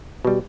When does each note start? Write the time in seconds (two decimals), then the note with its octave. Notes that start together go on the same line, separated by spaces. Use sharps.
0.25 B2 G3